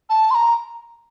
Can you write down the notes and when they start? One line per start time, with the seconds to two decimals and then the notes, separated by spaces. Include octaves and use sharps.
0.10 A5
0.31 C6
0.35 A#5